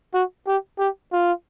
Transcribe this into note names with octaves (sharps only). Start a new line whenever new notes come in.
F#4
G4
G4
F4